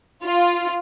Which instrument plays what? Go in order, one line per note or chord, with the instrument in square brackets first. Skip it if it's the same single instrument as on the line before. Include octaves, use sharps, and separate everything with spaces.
[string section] F4